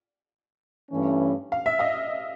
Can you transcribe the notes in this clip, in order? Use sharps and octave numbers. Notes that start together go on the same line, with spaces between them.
G2 E3 A3 C#4
F5
E5
D#5 F5